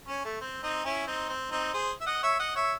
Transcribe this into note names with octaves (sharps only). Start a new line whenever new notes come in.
C#4
A3
C4
C4 D#4
C#4 E4
C4 D#4
C4
C4 D#4
G#4 C5
E5
D#5 F#5
C#5 E5
D#5 F#5
C#5 E5